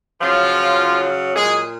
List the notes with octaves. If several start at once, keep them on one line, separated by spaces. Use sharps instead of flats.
C#3 F3 F#3 F4
A#2 F#3 G#3 G#4